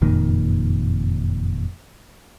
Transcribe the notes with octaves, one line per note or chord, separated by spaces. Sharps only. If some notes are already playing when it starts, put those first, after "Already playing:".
F#1 F2 A#2 D#3